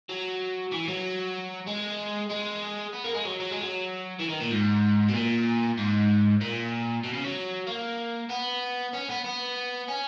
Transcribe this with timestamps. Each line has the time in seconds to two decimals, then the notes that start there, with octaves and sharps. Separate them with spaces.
0.09 F#3
0.72 E3
0.88 F#3
1.67 G#3
2.30 G#3
2.93 B3
3.04 A#3
3.14 G#3
3.25 F#3
3.40 F#3
3.51 G#3
3.61 F#3
4.20 E3
4.30 D#3
4.41 A#2
4.52 G#2
5.08 B2
5.14 A#2
5.78 G#2
6.41 A#2
7.04 B2
7.14 C#3
7.25 F#3
7.67 A#3
8.30 B3
8.93 C#4
9.09 B3
9.24 B3
9.88 C#4